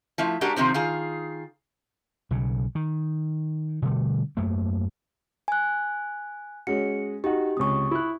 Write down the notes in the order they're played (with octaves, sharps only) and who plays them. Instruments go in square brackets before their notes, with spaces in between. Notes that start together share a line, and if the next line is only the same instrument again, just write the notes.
[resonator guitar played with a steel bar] F3 A3 E4
G#3 D4 F#4 G4 A#4
C3 D#3 F3 C4
D#3 F4 G#4
[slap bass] B1 C#3
D#3
B2 D3 G3 A3
F#2 A3 A#3
[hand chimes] G#5 F#6
[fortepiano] G#3 C#4 F#4 [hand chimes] C#7
[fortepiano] D#4 F#4 [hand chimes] G4
[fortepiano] C#2 C3 [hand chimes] C#6 D#6
[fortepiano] E4 F#6